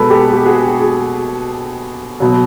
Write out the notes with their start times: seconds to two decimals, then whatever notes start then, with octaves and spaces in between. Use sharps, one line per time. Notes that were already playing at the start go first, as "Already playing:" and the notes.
Already playing: B2 G#3 A4 B4
0.10 G4 A4
0.33 G4
0.45 F#4 G#4
0.80 F#4 G#4
2.20 B2 F#3